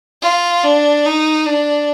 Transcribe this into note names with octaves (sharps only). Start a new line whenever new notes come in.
F4
D4
D#4
D4